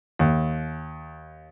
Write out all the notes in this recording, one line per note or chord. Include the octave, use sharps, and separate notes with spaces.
D#2